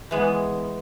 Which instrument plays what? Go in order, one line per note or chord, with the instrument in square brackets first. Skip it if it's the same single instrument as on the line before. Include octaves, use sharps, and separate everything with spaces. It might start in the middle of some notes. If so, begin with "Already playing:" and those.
[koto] E3 G#3 B3